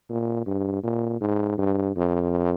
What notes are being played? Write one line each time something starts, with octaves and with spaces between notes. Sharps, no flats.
A#2
G2
A#2
G#2
G2
F2